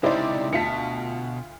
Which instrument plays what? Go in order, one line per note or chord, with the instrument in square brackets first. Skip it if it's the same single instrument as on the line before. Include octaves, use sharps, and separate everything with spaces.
[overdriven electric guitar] C#2 C3 [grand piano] D#4 E4 G4 [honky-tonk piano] C5 D5
[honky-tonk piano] D2 F4 B6 [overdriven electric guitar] B2 [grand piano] A5 C#7